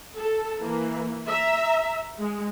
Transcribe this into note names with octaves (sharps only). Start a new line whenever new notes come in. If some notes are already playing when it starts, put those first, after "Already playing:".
A4
E3 A#3
E5 A#5
G#3